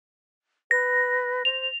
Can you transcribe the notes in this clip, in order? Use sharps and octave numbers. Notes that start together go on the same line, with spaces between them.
B4 A#6
C5 F7